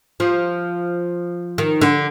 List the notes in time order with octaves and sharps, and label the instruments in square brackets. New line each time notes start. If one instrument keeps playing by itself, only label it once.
[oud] F3
D#3
D3